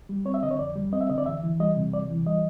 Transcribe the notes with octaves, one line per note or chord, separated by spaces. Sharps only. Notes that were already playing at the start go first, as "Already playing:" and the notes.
G3
C4 C#5
E5
D3 D#5
C#5
F2 D5
G3
C4 D#5
E5
D3 D#5
D5
E2 E5
E3
G3 D#5
C3
E2 D5
E3
G3 D#5